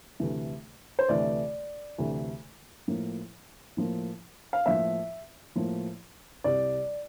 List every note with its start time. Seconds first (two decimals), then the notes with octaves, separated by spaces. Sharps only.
0.20 D2 C3 E3 A3
0.99 C5
1.09 D2 C3 E3 A3 D5
1.98 D2 C3 E3 A3
2.88 A2 F3 A#3
3.77 A2 F3 A#3
4.53 F5
4.66 A2 F3 A#3 E5
5.55 A2 F3 A#3
6.44 C2 C3 G3 D5